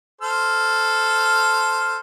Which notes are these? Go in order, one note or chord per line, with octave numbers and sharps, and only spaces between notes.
A4 C5 F6